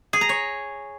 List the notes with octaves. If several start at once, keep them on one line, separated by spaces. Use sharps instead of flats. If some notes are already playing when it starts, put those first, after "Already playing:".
G#4
A#5
C#5